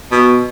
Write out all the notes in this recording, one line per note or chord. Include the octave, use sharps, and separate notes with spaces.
B2